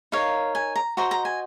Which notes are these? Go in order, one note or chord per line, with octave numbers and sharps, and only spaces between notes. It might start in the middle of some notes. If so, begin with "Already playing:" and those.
D#4 A#4 C#5 F5
G#5
A#5
F#4 C5 D#5 A#5
A#5
G#5